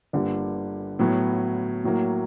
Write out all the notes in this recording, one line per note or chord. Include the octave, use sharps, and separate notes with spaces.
G1 G2 D3 G3 A#3
A2 F#3 B3
A2 F#3 A#3